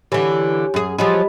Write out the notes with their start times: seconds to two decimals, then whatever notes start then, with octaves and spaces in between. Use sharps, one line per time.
0.12 D3 E3 G4 C#5 G#5
0.74 F#2 G#4
0.99 F3 F#3 G4 G#4 D#5 B5